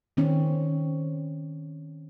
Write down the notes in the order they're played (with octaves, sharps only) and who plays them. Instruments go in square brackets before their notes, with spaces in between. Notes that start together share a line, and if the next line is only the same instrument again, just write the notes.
[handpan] D#3 C4 C#4